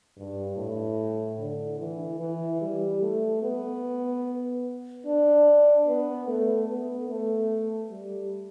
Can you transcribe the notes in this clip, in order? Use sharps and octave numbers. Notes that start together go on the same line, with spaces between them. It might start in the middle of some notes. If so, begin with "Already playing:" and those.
G2
A2
D3
E3
E3
G3
A3
B3
D4
B3
A3
B3
A3
G3